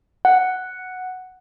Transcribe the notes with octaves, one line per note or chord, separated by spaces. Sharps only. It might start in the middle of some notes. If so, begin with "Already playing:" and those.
F#5